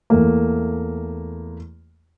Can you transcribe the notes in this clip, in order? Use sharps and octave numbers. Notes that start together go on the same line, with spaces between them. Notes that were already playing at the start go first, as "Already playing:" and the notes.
E2 A3 A#3